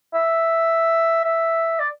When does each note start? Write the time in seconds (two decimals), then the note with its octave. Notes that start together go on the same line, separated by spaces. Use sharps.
0.14 E5
1.24 E5
1.80 D5